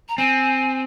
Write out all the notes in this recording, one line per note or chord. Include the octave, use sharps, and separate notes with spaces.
A#5
C4 G#5